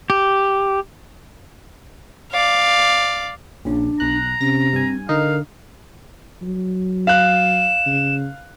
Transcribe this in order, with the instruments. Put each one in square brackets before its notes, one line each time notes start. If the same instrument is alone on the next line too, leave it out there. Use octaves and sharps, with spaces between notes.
[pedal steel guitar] G4
[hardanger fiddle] D5 F5
[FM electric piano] A#1 C#3 [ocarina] D4
[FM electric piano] B1 F#6 [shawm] A#5
[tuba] C3 [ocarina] C#4 [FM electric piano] A#6
[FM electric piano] G2 G#5 [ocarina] C4
[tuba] D3 [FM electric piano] D#4 [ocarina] A#4 [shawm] F5
[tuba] F#3
[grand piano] F5 F#6 [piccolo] E7
[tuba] C#3